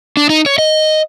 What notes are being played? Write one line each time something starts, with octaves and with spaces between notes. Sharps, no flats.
D4
D#4
C#5
D#5